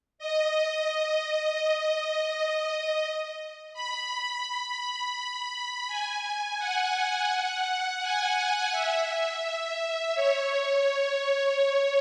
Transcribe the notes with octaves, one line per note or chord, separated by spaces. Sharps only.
D#5
D#5
B5
B5
G#5
F#5
G#5
E5
C#5